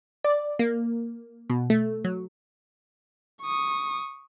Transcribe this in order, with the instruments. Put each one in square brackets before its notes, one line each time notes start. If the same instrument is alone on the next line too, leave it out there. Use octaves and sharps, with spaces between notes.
[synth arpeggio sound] D5
A#3
B2
A3
F#3
[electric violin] C#6 D#6